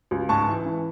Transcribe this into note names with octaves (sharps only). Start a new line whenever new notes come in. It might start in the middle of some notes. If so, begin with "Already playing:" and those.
C#2
G#2 A5 C#6
E3
E3